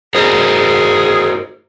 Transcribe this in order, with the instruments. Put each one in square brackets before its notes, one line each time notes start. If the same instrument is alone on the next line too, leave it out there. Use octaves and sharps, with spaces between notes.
[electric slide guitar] F#4 A#4 C5 [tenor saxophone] G#4